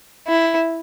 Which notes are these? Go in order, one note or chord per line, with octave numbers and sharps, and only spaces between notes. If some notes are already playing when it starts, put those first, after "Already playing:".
E4